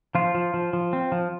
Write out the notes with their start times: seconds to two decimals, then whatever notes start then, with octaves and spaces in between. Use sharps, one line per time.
0.15 F3 F4
0.35 F3
0.54 F3
0.73 F3
0.93 C4
1.12 F3